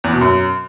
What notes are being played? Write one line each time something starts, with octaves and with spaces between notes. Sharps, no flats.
E2
B2
F#2